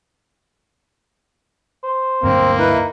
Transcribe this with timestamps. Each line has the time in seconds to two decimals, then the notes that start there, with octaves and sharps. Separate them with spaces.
1.83 C5
2.23 D2 G2 F#3 A#3 C4
2.59 D#4 E4 B4